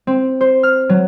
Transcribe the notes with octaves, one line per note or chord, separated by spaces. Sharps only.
C4
C5
F6
F#3